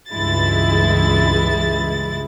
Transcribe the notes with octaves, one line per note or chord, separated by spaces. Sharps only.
C#2 G2 E3 G#3 E4 A6